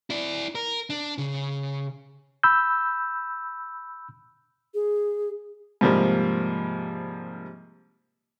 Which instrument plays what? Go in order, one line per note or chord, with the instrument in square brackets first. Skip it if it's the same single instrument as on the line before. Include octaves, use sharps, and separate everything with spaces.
[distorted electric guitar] E4 D5
A#4
D4
C#3
[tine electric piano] B5 E6 G6
[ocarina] G#4
[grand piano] G#2 C3 F3 G3 A#3